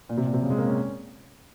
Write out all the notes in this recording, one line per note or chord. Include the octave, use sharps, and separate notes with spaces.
A#2
C3
A#2
C3
C#3
G#3
A#3
C#4